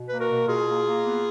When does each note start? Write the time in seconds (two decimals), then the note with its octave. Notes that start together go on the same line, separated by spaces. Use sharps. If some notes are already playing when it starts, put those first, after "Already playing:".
Already playing: B2
0.09 A#3 B4
0.20 F#4 A#4
0.30 B2
0.48 B2 F4 G#4
0.67 A#3
0.86 A#3
1.04 B3